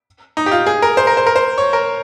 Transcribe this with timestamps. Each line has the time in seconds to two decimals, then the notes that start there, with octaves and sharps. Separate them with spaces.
0.37 D#4
0.46 G4
0.51 F4
0.67 G#4
0.82 A#4
0.97 C5
1.07 A#4
1.17 C5
1.27 A#4
1.36 C5
1.58 C#5
1.73 A#4